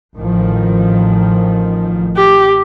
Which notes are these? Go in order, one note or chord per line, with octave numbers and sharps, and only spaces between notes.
A1 D#3 F3
G4